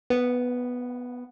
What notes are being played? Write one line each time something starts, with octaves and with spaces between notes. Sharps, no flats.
B3